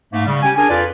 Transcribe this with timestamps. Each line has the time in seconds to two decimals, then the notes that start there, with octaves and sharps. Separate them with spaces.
0.13 G#2 A3 A#3
0.26 C#3 G3
0.43 C#4 G4 G5 G#5
0.56 D4 G#4 A#4 G#5
0.70 F2 F4 B4 D5